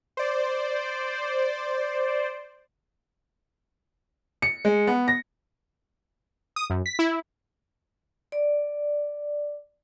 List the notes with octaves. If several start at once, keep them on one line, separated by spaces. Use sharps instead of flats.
C5 D5
C#7
G#3
B3
A#6
D#6
F#2
B6
E4
D5